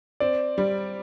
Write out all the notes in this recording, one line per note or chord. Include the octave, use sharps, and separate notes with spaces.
C4 D5
G3